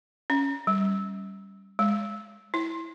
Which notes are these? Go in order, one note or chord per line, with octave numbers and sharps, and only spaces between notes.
C#4
G3
G#3
E4